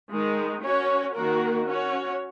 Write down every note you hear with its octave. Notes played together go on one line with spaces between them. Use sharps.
D#3 G#3 D#4
C#4 F#4 C#5
D#3 A#3 F#4 A#4
C#4 F#4 C#5